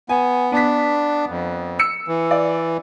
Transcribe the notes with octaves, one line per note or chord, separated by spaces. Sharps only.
B3 G#5
B3 D4 B6
F2
E6 C#7
E3
D5